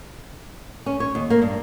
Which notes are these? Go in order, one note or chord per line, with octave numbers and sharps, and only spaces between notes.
C#4
C#5
D#2
A#3
G2